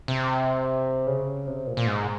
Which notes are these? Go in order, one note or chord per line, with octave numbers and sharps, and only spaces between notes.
C3
C#3
C3
A#2
A#2
G#2